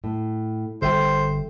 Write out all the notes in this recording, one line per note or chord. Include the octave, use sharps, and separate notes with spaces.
A2
G1 G3 A4 C5 E5 G5